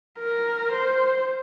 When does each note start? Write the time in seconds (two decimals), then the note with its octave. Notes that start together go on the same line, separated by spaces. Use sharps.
0.19 A#4
0.72 C5